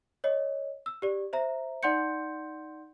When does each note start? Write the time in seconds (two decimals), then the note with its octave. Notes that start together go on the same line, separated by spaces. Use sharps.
0.24 C#5 D#5
0.86 E6
1.02 G4 D5
1.33 C5 E5 A#5
1.83 D#4 D5 F#5 C6 G6 C#7